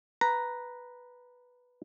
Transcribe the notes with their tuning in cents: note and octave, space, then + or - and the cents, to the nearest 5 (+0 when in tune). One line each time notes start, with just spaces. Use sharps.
B4 +0 A#5 +0